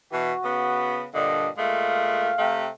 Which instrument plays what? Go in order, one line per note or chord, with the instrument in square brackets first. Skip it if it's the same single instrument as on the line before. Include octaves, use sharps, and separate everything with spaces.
[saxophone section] B2 E3 [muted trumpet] F#4
[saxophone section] C#3 B3
[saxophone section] G2 A#2 D3 [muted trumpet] D#5
[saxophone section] A#2 G#3 A3 [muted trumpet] F5
[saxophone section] C3 A3 G4